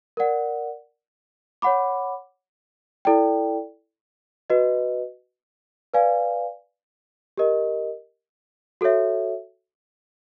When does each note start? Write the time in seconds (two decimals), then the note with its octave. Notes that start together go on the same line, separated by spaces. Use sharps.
0.17 A#4 D5 F#5
1.62 C#5 F#5 B5 D6
3.05 E4 A4 D5 G5
4.50 F#4 B4 D#5
5.94 B4 D5 F5 G#5
7.37 G4 A#4 D#5
8.81 F#4 A4 C#5 E5